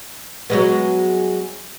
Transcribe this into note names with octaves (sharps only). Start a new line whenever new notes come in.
F#3 G#3 B3